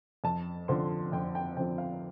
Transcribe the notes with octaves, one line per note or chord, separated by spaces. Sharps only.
F2 A5
D3 F3 C4 C6
F2 G5
G5
D3 F3 C4 G5
F5